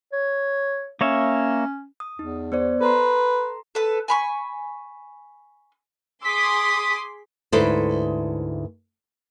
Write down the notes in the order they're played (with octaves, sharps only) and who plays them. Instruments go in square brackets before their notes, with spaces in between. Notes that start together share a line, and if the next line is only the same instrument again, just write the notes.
[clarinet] C#5
[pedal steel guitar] A#3 C#5 E5 [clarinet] C#4
[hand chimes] D#6
[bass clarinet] E2 [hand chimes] D#4
[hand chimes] B3 C5 D5
[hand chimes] A4 A#5 C6 [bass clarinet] B4
[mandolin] A4 B4
G#5 B5 C#6
[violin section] G#4 C6 D6 [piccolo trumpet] D#6 [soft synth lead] B6
[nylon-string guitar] D2 G#2 E4 A4 B4 C5